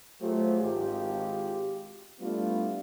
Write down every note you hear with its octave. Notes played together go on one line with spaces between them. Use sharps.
F#3 A3 F4 G4 G#4 C5
G#1 F4 G4
G3 A3 B3 D4 E4 F4